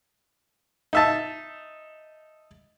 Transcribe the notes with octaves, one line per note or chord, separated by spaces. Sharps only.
D#4 E5 A5